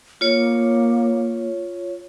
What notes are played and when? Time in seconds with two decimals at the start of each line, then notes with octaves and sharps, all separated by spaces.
0.21 A#3 F4 C#5